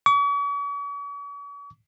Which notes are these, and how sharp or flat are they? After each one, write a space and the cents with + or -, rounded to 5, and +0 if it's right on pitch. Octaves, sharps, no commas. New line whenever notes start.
C#6 +45